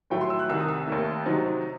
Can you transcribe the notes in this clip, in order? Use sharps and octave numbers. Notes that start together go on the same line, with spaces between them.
A2 F#3 A3 E4 G5
C6
E6
F#6
C2 C3 D#3 E6
D#6
E6
D#2 D#3 A3
C3 F#3 C4 D#4